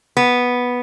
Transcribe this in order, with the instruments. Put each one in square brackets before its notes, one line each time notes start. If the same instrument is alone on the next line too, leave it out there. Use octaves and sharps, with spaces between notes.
[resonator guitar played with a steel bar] B3